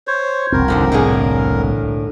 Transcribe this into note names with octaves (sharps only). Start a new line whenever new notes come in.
C5 C#5
E1 C2 C4 A#4
D#2 D3 F3
A2 D3 G#4